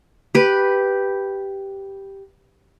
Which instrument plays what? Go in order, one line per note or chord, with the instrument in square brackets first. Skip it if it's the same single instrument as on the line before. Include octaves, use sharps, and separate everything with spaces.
[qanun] G4 B4